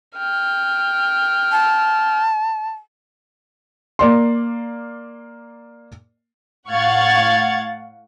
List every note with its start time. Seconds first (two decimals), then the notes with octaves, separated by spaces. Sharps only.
0.17 G5 F6
1.52 A5
3.99 A#3 D5 C6
6.68 A2 F5 F#5 C#6 G#6 A6